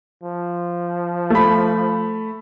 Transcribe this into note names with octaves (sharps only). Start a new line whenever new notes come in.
F3
A3 B5